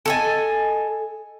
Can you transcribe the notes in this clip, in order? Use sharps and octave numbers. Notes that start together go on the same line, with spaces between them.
A4 D#5 G#5